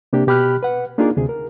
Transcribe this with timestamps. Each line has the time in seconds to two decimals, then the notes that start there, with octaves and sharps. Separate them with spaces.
0.13 C3 A#3 D4 G4
0.27 B2 G4 B5 F6 F#6
0.63 B4 F#5
0.98 A#3 D4 D#4 F4 G#4 A#4
1.17 D2 C3 G#4
1.29 A#4